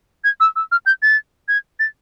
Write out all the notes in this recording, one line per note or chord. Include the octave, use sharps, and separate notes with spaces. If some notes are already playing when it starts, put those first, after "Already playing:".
G#6
E6
E6
F6
G6
A6
G#6
A6